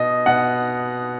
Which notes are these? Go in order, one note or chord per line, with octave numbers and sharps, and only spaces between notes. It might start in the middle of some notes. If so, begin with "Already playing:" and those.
Already playing: B2 D#5
B2 F#5